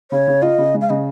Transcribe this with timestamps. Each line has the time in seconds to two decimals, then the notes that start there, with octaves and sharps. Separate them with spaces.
0.11 C#3 C#5
0.28 C#3
0.42 F4 D#5
0.58 C#3
0.74 G#3
0.81 F5
0.90 C#3 D#5